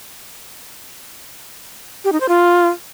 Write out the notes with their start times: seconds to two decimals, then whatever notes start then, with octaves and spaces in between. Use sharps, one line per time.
2.04 G4
2.12 D#4
2.21 C5
2.29 F4